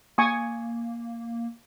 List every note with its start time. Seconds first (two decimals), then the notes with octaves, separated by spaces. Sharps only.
0.18 A#3 G#5 C#6 D#6